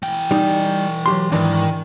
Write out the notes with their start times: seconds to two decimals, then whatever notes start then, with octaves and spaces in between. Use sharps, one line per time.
0.03 E3 G5
0.31 G3 D#4
1.06 F#3 G4 C6
1.32 D#2 G#2 D#3 E3 D4